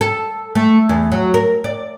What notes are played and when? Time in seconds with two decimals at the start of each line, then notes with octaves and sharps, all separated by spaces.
0.01 A4
0.55 A3
0.89 E2
1.12 F#3
1.34 A#4
1.64 D5